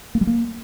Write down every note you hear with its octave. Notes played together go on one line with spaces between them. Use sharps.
A#3
G3
A#3